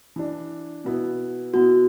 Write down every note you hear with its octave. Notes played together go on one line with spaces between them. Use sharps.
E3 D4
B2 B3 E4
B2 B3 E4 F#4